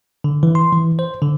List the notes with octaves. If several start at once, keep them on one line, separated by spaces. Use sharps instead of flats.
D3
E3
C6
E3
C5
D3